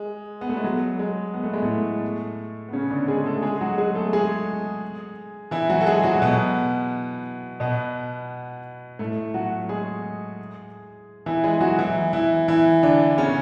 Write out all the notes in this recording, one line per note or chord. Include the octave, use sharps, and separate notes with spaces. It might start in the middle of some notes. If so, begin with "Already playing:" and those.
Already playing: G#3
B3
A3
G#3
F#3
G#3
B3
A3
G#3
A2 A3
B3
C#3 C#4
D3 D4
G#3 G#4
A3 A4
G#3 G#4
F#3 F#4
G#3 G#4
A3 A4
G#3 G#4
E3 E4
F#3 F#4
A4
G#3 G#4
F#3 F#4
B2 B3
B2 B3
A2 A3
F#3 F#4
G#3 G#4
E3 E4
G#3 G#4
F#3 F#4
E3 E4
E3 E4
E3 E4
D3 D4
C#3 C#4